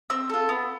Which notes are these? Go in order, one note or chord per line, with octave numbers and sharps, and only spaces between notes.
C4 E6
F4 A4
B3